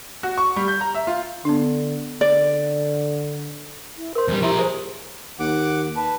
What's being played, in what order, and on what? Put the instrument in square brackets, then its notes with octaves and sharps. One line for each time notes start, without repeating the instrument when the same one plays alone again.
[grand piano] F#4
C#6
G3
G6
A#5
E5
F4
[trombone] D3 [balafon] B3 D4
[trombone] D3 [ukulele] D5
[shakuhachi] E4
[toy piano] A#4 C6 [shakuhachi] C5
[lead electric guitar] E2 G3
[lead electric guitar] F3 A#4 [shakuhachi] E4 [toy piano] G4 C6
[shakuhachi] G#4 [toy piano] C5 C#5
[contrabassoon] D#2 [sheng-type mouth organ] F#5 D6
[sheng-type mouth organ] B4 [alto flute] A5